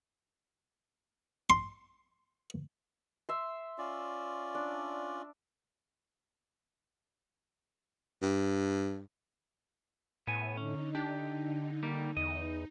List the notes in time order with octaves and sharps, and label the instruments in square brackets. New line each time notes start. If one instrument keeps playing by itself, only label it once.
[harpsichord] C6
[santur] E5 C6
[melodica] C#4 F4 D5
[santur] D4
[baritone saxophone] G2
[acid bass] A2 [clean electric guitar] B3 G#5
[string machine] D3 D#4 [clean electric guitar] C#4
[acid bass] D4 [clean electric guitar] G4
[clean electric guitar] G3 A#3 G4
[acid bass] E2 [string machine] D#4 [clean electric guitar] D#5